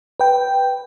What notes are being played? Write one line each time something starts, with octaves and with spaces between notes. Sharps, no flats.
B4 G5